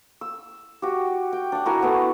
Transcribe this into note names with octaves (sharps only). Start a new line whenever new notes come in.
E6
F#4 G4
G5
D4 F#5
E4 F#4 A#4 G#5
A3 B3